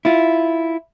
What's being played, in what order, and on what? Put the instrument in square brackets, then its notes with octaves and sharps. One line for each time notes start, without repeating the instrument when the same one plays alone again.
[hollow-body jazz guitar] E4 F4